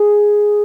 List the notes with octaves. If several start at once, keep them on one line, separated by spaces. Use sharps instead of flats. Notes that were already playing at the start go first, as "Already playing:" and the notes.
Already playing: G#4